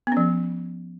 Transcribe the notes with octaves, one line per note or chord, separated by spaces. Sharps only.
F3 B3 C#4